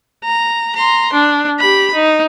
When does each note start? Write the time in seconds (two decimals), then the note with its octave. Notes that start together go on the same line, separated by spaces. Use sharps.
0.24 A#5
0.75 A#5 C6
1.13 D4
1.59 G4 B5
1.94 D#4